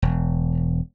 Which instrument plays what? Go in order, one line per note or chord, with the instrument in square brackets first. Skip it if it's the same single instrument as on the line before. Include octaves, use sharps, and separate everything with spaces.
[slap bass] E1